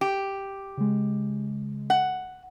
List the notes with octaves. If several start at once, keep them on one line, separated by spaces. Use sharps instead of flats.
G4
C#3 G#3
F#5